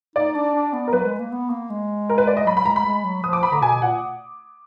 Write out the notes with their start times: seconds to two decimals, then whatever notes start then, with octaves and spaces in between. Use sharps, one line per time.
0.16 D#4 D5
0.34 D4
0.55 D4
0.73 B3
0.87 A#4
0.93 F#3 B4
1.05 G#3
1.19 A#3
1.32 B3
1.50 A#3
1.69 G#3
2.10 A#4
2.18 B4
2.27 D5
2.37 D#5
2.46 F#3 B5
2.57 B5
2.65 G#3 A#5
2.76 B5
2.86 G#3
3.05 F#3
3.23 F3 D#6
3.33 D6
3.43 B5
3.52 D3 A#5
3.62 B2 G#5
3.82 A#2 F#5